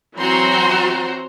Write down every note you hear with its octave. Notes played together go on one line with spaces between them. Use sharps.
E3 F#3 C4 F#4 A#5 C6